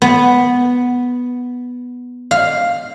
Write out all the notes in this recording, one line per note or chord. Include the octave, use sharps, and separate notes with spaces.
B3
F5